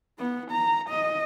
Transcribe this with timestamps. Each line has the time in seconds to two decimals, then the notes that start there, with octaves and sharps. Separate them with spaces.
0.19 B3
0.51 A#5
0.90 D#5